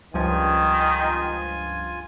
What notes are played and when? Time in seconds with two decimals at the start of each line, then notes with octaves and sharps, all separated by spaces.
0.14 C#2 G2 D#3 F3 F4 G#5